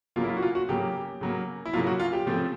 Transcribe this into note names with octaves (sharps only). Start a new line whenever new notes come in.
C#3 F#3 A#3 F4
E4
F4
F#4
F4
F#4
C#3 F#3 A#3 G4
C#3 F#3 A#3
E4
C#3 F#3 A#3 F4
F#4
F4
G4
C#3 F3 A3 C4